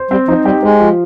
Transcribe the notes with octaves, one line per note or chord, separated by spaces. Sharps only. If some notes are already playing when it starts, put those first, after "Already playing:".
Already playing: C5
G3 C4
F3 D#4
G3 G4
G#3 C5
F3